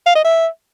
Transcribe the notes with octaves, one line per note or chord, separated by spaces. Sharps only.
F5
D#5
E5